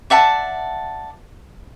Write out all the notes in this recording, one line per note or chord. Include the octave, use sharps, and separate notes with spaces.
D5 E5 F#5 A5